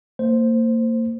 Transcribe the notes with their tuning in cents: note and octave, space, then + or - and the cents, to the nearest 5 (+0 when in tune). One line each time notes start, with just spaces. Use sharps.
A#3 -30 C5 +0